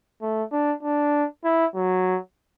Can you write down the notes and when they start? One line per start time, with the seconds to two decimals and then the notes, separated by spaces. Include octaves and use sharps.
0.22 A3
0.52 D4
0.83 D4
1.44 E4
1.75 F#3